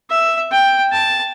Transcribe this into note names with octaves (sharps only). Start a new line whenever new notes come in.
E5
G5
A5